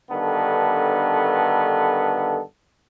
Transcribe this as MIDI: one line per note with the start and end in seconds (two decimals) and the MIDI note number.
0.11 2.41 43
0.11 2.41 50
0.11 2.41 51
0.11 2.41 59
0.11 2.41 69